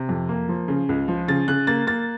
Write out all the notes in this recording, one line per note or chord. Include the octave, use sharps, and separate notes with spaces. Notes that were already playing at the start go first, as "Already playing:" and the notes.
Already playing: C3
F2
A#3
F3
C#3
C#2
F3
C#3 A6
C#3 F#6
A#3 A6
A#3 A6